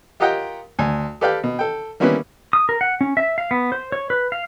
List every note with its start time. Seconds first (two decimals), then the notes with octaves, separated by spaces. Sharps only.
0.20 F4 G4 A#4 D#5 F#5 G5
0.79 D2 G#5
1.21 G4 A4 B4 D5 F5 G5
1.44 B2
1.59 A4 G5
2.00 G3 A#3 B3 C#4 E4 B4
2.53 D#6
2.69 A#4
2.81 F#5
3.01 C#4
3.17 E5
3.38 F5
3.51 B3
3.72 C5
3.92 C#5
4.10 B4
4.32 F5